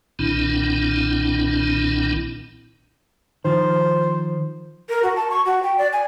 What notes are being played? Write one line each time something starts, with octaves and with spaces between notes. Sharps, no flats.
B1 A#2 D#3 C4 D4 E4
D#3 F3 C5
A#4
F#4
A5
C#6
F#4
G5
D5
G#5